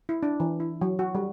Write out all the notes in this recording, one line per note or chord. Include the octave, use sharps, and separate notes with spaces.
E4
D4
E3
E4
F#3
F#4
G3